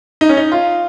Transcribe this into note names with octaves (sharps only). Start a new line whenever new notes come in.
D#4
C#4
D#4
F4